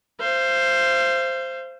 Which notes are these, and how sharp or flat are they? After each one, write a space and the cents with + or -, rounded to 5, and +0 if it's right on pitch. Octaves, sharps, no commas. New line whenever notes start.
C5 +0 F5 -40